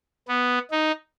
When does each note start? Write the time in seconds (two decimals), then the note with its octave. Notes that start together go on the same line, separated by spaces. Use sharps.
0.28 B3
0.71 D#4